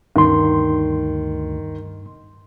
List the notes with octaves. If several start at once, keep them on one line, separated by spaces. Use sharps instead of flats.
D2 G2 D#3 C6